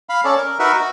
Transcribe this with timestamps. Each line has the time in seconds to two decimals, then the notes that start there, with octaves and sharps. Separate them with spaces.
0.09 F5 B5
0.24 C#4 A4 C#5 D5
0.38 A#4
0.59 D#4 F#4 A#4 B4 E5 F#5
0.75 F#4